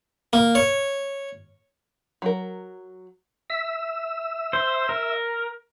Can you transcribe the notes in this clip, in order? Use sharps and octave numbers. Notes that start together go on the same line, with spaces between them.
A#3
C#5
F#3 A#4
E5 E6
C5
A#4